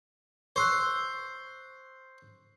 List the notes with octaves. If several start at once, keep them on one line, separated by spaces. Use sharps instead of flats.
C5 C#6 E6 F#6